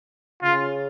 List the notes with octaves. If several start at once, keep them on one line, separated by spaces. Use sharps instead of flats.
C#3 F4